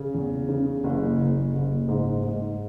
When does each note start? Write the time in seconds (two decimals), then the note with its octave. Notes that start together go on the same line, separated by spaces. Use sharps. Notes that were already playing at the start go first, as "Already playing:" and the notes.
Already playing: C#3
0.14 E2
0.49 C#3
0.84 F#1
1.19 F#1
1.54 F#1
1.88 G#2
2.24 G#2